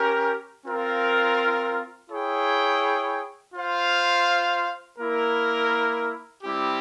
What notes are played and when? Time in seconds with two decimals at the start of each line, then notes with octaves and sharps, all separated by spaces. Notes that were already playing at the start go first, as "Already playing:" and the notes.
Already playing: C#4 G4 A#4
0.66 C4 F4 A#4 F5
2.10 E4 G#4 C#5 G5
3.54 F4 C5 F5
4.98 A#3 E4 A#4
6.43 G3 C4 E4 G4